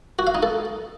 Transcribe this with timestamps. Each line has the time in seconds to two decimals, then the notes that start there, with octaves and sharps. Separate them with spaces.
0.19 F#4
0.27 F5
0.35 D#4
0.43 A4